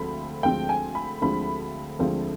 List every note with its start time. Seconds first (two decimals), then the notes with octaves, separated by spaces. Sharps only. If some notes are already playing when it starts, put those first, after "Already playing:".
Already playing: D2 D3 F3 G#3 C4 B5
0.43 D2 D3 F3 G#3 C4 G5
0.69 G#5
0.95 B5
1.21 D2 D3 F3 G#3 C4 B5
1.99 D2 D3 F3 G#3 C4